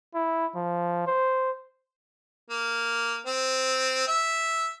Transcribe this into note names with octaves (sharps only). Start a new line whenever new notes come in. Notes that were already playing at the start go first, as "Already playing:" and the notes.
E4
F3
C5
A#3
C4
E5